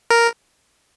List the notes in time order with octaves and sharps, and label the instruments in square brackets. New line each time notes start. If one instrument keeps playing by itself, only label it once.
[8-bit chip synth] A#4